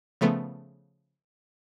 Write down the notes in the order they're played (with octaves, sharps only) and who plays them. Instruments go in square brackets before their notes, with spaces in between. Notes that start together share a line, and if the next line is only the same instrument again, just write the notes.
[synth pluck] C#3 F3 A3 B3